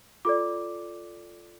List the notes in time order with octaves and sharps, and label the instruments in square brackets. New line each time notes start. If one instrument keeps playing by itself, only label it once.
[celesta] F4 A4 D5 D6